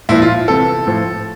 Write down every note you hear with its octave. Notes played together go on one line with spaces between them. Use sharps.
A#2 F3 E4
F4
C3 E3 A4
A2 F3